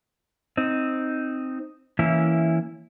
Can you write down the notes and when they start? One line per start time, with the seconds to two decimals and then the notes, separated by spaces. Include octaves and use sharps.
0.57 C4 D#4
1.99 E3 A#3 C#4 E4